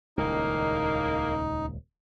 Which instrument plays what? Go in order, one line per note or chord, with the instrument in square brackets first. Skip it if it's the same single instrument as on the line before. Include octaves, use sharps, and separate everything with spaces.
[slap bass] D#1 C#2 [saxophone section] A2 G#3 A#3 [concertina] D#4